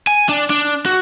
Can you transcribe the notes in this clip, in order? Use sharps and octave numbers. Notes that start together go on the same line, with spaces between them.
G#5
D4
D4
F#4